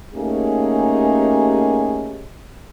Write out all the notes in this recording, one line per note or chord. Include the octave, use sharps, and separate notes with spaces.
A3 A#3 C#4 D#4 G4 G#4